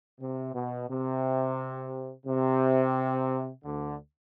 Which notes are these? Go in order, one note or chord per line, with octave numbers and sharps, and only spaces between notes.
C3
B2
C3
C3
D2 D3